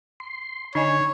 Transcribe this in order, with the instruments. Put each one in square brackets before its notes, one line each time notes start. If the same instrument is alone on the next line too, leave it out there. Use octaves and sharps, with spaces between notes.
[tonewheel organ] C6
[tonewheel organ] D3 [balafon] D#4 D#5 G#5 [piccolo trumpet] C#5